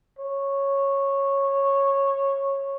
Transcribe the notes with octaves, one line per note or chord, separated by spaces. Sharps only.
C#5